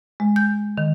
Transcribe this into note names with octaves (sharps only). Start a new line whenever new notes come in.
G#3
G6
D#3